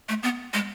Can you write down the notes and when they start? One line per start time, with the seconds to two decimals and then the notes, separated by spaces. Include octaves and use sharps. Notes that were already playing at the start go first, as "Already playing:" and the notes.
0.09 A3
0.23 B3
0.54 G#3